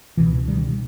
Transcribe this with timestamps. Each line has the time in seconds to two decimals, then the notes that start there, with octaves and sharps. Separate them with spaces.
0.17 C#2 B2 E3
0.48 D#3 G3